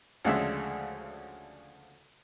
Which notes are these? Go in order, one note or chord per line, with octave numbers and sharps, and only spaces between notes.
D2 C#3 F3 G#3 D4 E5